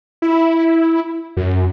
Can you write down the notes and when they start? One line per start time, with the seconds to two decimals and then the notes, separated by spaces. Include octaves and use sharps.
0.22 E4
1.37 F#2